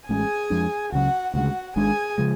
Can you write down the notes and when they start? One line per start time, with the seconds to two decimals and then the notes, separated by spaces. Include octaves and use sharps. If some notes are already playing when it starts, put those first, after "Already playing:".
0.09 A1 A2 G#3 C#4 G#4 G#5
0.50 F2 F3 G#3 D4
0.92 C#2 C#3 F#3 F#4 F#5
1.34 D2 C#3 G#3 F#4 F#5
1.76 G#1 G#2 G#3 D4 G#4 G#5
2.18 C#3 F3 G#3